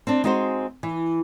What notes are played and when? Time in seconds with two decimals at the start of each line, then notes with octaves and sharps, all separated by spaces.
0.07 C4 D4
0.24 G#3 C4 D#4 F#4 G#4 C5
0.83 E3